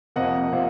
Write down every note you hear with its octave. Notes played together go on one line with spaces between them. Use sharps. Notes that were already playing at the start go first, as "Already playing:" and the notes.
F2 C3 F3 A#3 D#5 F#5
C3 F3 A#3